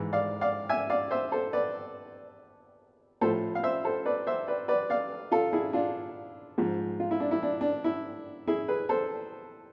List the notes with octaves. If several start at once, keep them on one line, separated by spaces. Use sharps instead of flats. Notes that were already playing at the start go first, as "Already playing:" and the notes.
Already playing: G#2 E3
D5 F5
D5 F5
E5 G#5
D5 F5
C5 E5
A4 C5
B4 D5
A2 F3 A4 C5
F5
C5 E5
A4 C5
B4 D5
C5 E5
B4 D5
B4 D5
D5 F5
F4 A4
E4 G#4
D4 F4
G#2 F3
F4
E4
D4
E4
D4
D4
E4
E4 G#4
G#4 B4
A4 C5